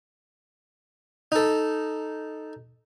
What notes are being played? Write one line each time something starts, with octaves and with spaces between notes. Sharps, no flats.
D#4 A4